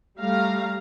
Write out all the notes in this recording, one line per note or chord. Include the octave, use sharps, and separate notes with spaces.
G3 A3 F5 A#5